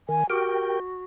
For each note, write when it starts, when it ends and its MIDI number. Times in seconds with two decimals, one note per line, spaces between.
0.09 0.24 51
0.09 0.29 80
0.30 1.05 66
0.30 0.80 67
0.30 0.80 70
0.30 0.80 79